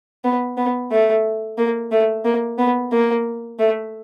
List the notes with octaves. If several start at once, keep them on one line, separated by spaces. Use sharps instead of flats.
B3
B3
A3
A#3
A3
A#3
B3
A#3
A3